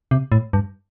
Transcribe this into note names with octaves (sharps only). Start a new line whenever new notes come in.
C3
A2
G2